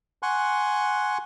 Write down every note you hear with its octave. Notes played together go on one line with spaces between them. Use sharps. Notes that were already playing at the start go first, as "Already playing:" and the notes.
F#5 G#5 C6 C#6 F#6